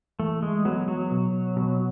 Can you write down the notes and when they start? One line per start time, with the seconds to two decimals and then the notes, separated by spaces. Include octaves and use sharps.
0.20 E3 A3
0.42 G#3
0.65 F#3 B3
0.88 F#3
1.11 B2
1.56 B2